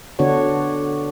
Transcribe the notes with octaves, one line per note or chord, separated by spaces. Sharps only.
D3 B3 D4 F#4 C#5